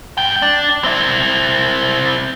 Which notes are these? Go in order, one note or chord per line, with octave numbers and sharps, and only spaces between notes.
G2 G5
D4
C4 E4